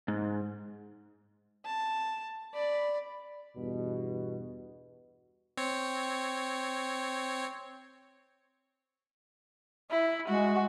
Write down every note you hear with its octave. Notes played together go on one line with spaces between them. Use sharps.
G#2
A5
D5 B5
E2 G2 B2
C4 C#5
E4
G#3 F#4